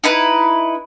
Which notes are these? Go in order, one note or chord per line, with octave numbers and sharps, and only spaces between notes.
D#4 E4 B4